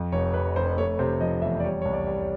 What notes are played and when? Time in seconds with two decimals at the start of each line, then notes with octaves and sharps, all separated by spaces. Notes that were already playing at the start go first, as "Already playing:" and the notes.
Already playing: F2
0.12 F1 C#5
0.34 F1 B4
0.56 F1 C5
0.78 A3 C#5
0.99 C3 C5
1.21 F3 D#5
1.42 E2 E5
1.60 D5
1.64 G3 C#5
1.82 C2 C#5
1.93 D5
2.07 G3
2.21 C#5